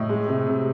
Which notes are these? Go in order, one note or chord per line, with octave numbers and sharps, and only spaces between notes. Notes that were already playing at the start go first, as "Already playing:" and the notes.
Already playing: A2 D#5
G#3
C3
C3